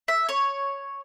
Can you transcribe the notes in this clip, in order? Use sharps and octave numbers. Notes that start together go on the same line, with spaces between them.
E5
C#5